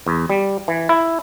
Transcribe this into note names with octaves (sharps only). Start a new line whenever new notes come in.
E2
G3
E3
E4